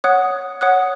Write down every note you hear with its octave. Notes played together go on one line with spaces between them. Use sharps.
C#5 F#5 D#6 F#6
C#5 F#5 D#6 F#6